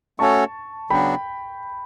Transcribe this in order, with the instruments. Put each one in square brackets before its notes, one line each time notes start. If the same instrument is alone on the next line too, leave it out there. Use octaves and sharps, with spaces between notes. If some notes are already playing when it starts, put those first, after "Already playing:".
[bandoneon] A3 C#4 F#4 A4 C#5 [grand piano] A5 C#6
[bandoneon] C#3 F#3 B3 D4 F#4 [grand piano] G5 B5